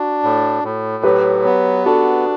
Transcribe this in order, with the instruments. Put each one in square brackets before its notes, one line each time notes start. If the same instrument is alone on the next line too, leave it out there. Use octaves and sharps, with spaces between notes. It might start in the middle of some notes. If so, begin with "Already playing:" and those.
Already playing: [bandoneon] D4 [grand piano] F#4
[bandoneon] A2
A2
[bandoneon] F#3 [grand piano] G4 B4
[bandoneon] B3
[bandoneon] D4 [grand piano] F#4 A4